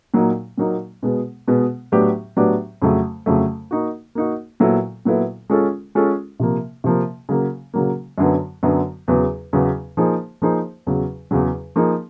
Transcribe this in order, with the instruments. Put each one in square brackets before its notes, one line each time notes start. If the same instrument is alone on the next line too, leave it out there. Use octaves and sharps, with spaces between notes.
[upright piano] A#2 F#3 A#3 D#4
A#2 F#3 A#3 D#4
B2 G#3 B3
B2 G#3 B3
A2 F#3 B3 D4 G4
A2 F#3 B3 D4 G4
F2 C#3 F#3 A3
F2 C#3 F#3 A3
A#3 D#4 F#4
A#3 D#4 F#4
A#2 F#3 B3 E4 A4
A#2 F#3 B3 E4 A4
G#3 C#4 F4 A4
G#3 C#4 F4 A4
C3 F3 A#3
C3 F3 A#3
C#3 F#3 A#3
C#3 F#3 A#3
F#2 D3 F#3 B3
F#2 D3 F#3 B3
E2 C#3 F#3 B3
E2 C#3 F#3 B3
F3 A#3 D#4 G#4 C5
F3 A#3 D#4 G#4 C5
E2 C#3 F#3
E2 C#3 F#3
F3 A#3 D#4 G#4